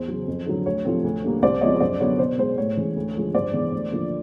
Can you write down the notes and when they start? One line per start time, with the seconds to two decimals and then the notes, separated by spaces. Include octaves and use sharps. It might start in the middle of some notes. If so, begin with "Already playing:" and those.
Already playing: E2 C5
0.08 C#3 F#3
0.28 F2
0.46 D3 F#3
0.66 D2 C#5
0.85 C3 F3 A3 C4
1.04 D2
1.24 D3 G3 A#3
1.42 C2 C5 D5
1.61 C3 F3 G#3 B3 C#5 D#5
1.75 C#5
1.80 F#2 C5 D5
2.00 D3 F#3 B3 C#5
2.19 B2 C5
2.39 G#3 B3 C5
2.58 A2 C#5
2.77 E3 G#3 C#4
2.96 D2
3.15 D3 F3 G#3
3.35 G2 C5 D5
3.53 E3 G#3 B3
3.72 D2
3.92 D3 F3 A#3